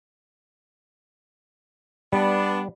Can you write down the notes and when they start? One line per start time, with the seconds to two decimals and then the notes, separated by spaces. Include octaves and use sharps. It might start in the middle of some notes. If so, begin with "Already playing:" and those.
2.13 G3 B3 D4